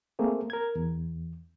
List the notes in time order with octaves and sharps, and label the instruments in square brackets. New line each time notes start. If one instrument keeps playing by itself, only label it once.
[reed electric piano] A3 A#3 C4 G#4
A#4 G#6
E2